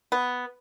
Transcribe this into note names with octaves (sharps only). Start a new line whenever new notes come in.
B3